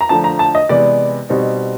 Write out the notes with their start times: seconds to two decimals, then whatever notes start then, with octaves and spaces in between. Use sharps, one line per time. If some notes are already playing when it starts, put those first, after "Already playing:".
0.01 A#5
0.09 D3 F3 A3 A5
0.24 A#5
0.39 A5
0.55 D#5
0.69 C3 E3 G#3 B3 D5
1.29 B2 G3 C4 D#4